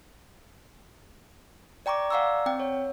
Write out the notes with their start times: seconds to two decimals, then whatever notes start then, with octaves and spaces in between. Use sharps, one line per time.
1.86 D5 G5 A#5 C#6 D6
2.10 D5 F5 F#5 A#5 C#6 E6
2.46 C4 G5
2.60 C#5